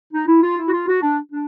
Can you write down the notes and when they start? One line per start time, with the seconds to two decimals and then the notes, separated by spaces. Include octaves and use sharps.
0.14 D#4
0.28 E4
0.43 F4
0.58 E4
0.68 F#4
0.73 F4
0.88 F#4
1.03 D4
1.32 D4